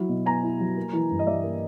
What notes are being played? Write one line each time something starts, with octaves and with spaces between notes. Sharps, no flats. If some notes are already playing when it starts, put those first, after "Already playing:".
Already playing: F#3 E4
B2
B3 G#5 A#5
E4
F#3
A#3
E3
G2
D#5
G3 D5 E5
A#3